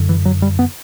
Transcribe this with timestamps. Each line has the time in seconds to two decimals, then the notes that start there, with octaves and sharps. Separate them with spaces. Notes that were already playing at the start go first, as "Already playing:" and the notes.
Already playing: F#2 D3
0.09 E3
0.25 F#3
0.42 G3
0.59 B3